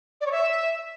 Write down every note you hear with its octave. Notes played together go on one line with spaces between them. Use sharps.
D5
C#5
E5